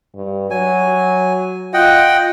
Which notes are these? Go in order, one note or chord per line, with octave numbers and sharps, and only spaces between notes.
G2
F#3 G#5
F4 D#5 F#5 G5